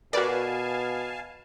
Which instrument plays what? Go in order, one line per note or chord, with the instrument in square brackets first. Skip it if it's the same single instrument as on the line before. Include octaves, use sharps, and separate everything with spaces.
[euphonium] B2 [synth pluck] F#4 D5 [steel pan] A#4 B4 [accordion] F5 G#5 A5